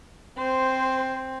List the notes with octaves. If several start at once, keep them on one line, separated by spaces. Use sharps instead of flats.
C4 C5